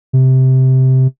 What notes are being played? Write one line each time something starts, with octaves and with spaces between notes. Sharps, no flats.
C3